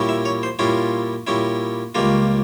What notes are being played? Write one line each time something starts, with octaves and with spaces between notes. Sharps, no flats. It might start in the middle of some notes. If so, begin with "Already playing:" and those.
Already playing: A#2 G3 C#4 E4
E5
C#5
C5
A#2 G3 C#4 E4 F4
A#2 G3 C#4 E4
C#2 C#3 G3 A#3 F4